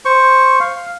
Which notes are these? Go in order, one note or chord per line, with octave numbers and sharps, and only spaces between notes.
C5 C#6
F5